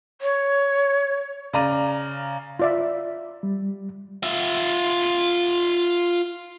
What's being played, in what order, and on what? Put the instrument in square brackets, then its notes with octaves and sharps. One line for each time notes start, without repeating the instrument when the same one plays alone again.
[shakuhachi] C#5
[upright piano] C#3 D5 A#5 D#7
[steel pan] F4 D5 E5
[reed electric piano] G3
[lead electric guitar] F4 E5